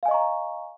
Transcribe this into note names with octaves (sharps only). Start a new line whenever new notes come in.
D#5 F5 G#5 A#5 C#6